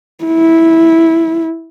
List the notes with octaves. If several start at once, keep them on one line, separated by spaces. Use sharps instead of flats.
E4